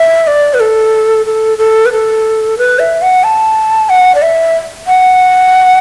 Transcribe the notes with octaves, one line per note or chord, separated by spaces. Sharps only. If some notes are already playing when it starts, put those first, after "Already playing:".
Already playing: E5
D5
B4
A4
A4
A4
B4
A4
B4
E5
F#5
A5
F#5
D5
E5
F#5